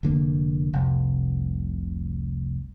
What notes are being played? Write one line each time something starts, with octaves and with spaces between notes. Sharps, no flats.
F1 D3 A#3
F1 C2